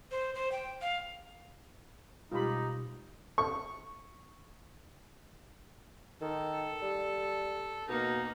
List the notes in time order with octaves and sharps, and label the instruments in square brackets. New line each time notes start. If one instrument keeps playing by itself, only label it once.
[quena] C5
C5
G5
F5
[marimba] B2 G3 G#3 [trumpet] D#4 [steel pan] F4 G4 B5
[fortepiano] C#6
[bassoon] D#3 [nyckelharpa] A4
[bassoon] G3
[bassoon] B2 [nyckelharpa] A#3 D#4